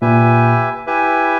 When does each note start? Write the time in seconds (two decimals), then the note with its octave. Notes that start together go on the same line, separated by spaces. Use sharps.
0.02 A#2 G4 B4 E5 G#5
0.87 E4 G4 B4 E5 G#5